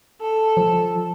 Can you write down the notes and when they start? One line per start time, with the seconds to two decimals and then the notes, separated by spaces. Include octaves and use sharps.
0.21 A4
0.57 F3